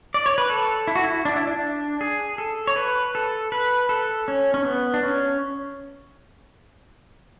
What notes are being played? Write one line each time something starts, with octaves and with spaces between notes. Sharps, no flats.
D5
C#5
B4
A4
E4
F#4
E4
D4
E4
D4
G#4
A4
C#5
B4
A4
B4
A4
C#4
C#4
B3
D4
C#4